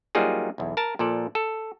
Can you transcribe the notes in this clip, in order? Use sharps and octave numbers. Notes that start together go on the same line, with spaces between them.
F#3 G3 A#3 D#4 F4 G#4
B1 E2
A#4 A5
A#2 F3 A4 D5
A4